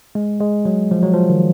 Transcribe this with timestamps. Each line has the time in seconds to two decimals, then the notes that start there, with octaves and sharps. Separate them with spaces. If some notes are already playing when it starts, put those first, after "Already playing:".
0.15 G#3
0.40 G#3
0.65 F#3
0.91 F3
1.02 F#3
1.13 F3
1.30 D#3